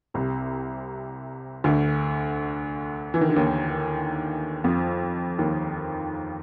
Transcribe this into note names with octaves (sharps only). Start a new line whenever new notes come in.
C2 C3
D2 D3
E3
D#3
D3
D#2 D#3
F2 F3
D#2 D#3